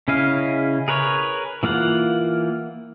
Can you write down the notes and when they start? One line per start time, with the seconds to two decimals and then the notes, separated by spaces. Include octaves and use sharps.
0.08 C#3 C#4 E4 D#5 F5
0.88 G#4 A#4 B4 C#5
1.63 E3 A#3 F4 F#5